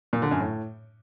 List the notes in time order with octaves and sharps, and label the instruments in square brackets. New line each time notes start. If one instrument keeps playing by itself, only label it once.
[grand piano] A#2
D3
F#2
A2